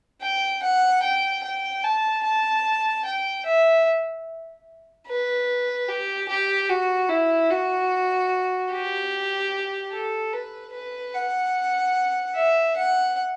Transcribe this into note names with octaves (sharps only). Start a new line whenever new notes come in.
G5
F#5
G5
G5
A5
A5
G5
E5
B4
G4
G4
F#4
E4
F#4
G4
A4
B4
B4
F#5
E5
F#5